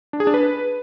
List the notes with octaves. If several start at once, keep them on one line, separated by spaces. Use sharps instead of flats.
D4
G#4
D4
B4